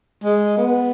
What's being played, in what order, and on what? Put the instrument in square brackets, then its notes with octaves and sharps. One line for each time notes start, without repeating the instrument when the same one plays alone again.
[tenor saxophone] G#3
B3